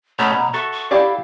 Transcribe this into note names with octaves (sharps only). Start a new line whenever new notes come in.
B2 A3 C#4 A#5
B2
F#4 A4 E5 C#6
C#6
E4 G4 D5 F5